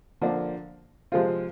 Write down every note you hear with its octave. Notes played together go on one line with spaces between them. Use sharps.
D3 F3 A#3 D4
C3 F3 G#3 C4 F4